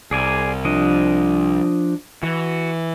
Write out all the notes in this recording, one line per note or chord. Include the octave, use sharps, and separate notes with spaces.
C2 G#4 D5 G#5
F3 D4 D#5
E3 F#4